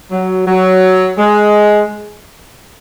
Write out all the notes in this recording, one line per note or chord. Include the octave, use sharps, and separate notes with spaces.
F#3
F#3
G#3